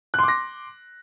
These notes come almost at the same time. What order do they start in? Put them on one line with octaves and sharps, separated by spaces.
F#6 C6 D6 A#6